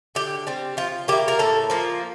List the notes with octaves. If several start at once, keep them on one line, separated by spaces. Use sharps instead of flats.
D3 G4
G3 C4
F3 F4
A#3 E4 G4
A#4
A2 A4
F3 A#3 F4